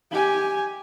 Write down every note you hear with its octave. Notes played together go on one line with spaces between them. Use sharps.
G4 G#5